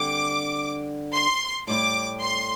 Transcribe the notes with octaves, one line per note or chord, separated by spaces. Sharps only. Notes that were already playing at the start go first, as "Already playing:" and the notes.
Already playing: D3 G3 C4 D6
C6
A2 G3 E4 D6
C6